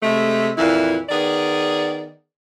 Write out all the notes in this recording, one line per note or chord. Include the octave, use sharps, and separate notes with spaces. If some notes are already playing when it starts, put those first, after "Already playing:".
C3 G#3 A3
F2 A#2 E3 E4
D#3 B3 G#4 D5